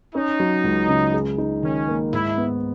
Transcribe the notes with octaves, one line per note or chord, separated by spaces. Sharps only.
C#4 D#4
F#3
C#2
C#3
G#4
D#4
D#3 C#4
A#3
G#2 E4
B3